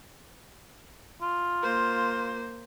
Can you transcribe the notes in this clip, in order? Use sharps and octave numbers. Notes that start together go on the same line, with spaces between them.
F4
A#3 C5